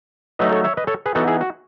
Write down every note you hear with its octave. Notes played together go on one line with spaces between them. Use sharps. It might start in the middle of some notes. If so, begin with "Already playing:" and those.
F#3 A3 D#4 B4 D#5
A4 C#5
C#5 E5
B4 D#5
A4 C#5
G#4 B4
E3 B3 D#4 F#4 A4
E4 G#4
F#4